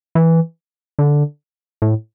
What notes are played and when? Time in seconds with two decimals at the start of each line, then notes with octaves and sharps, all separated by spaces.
0.15 E3
0.99 D3
1.82 A2